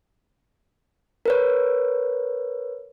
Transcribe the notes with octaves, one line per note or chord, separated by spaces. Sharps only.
A#4 B4 C#5